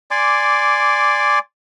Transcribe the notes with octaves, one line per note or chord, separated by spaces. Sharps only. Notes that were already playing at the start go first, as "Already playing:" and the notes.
D5 G#5 C6 D6